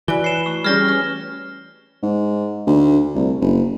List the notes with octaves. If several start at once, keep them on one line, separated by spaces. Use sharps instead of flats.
E3 F#4 B4 D5 G#5 G7
C#5 C7 E7
A3 C#6
G3 C#4 G4 G#4 F6 A#6 G7
C#4 B4
G#2
D2
C2
F#1